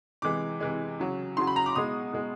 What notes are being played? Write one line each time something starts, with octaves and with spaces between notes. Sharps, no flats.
C3 E3 G#3 D6
C3 E3 G#3
C#3 F#3
C#3 F#3 C6
B5
A#5
D6
B2 G#3 D#6
B2 G#3